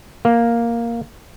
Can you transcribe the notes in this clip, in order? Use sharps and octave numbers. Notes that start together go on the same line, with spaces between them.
A#3